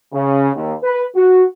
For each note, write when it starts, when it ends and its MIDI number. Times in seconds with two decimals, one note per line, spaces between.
0.13 0.49 49
0.55 0.73 39
0.83 1.03 71
1.15 1.44 66